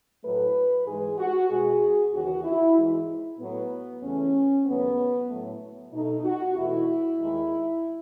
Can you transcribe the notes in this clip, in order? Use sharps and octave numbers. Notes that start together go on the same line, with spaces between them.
A2 F#3 A3 B4
G#2 E3 G#3 G#4
F#4
B2 G#3 G#4
D#2 C#3 E3 F#4
E4
G#2 E3 G#3
A2 F#3 A3 B3
E2 C#3 E3 A3 C#4
D#2 C#3 F#3 A3 B3
A2 F#3 A3
B2 A3 D#4
F#4
E2 B2 A3 E4
D#2 D#3 G#3